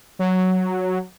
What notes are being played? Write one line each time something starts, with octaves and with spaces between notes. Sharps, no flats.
F#3